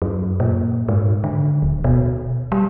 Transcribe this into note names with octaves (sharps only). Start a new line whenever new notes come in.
F#2
A#2
G#2
D3
D1
B2
G3